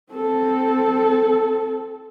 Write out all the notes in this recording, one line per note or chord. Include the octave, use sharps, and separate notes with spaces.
C4 A4